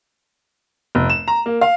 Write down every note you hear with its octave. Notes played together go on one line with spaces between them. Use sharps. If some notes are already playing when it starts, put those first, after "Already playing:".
F1
E7
A#5
A#3
F5